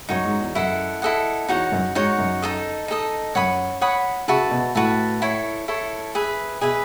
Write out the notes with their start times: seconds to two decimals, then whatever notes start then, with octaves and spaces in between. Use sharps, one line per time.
0.09 F#2 D#4 F#4 C#5
0.25 G#2
0.40 E2
0.55 F#2 E4 A4 D#5 F#5
1.02 E4 A4 D#5 F#5
1.48 E2 D#4 F#4 C#5 F#5
1.72 F#2
1.95 G#2 D#4 F#4 C#5 F#5
2.18 F#2
2.42 D#4 A4 D#5
2.88 D#4 A4 D#5
3.35 F#2 C#5 F#5 B5 D#6
3.81 C#5 F#5 B5 D#6
4.28 C#3 F#4 B4 E5 A5
4.51 B2
4.75 A2 F#4 B4 E5 A5
5.22 E4 A4 C#5
5.68 E4 A4 C#5
6.15 G#4 B4 E5
6.61 B2 G#4 B4 E5